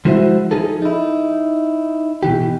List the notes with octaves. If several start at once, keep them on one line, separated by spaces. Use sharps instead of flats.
F3 G#3 E4 F#4 C5 E5
F3 D#4 G#4 A4
D#4 E4
B2 E3 G4